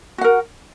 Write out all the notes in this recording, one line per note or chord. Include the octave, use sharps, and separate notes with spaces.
F#4 A#4 F#5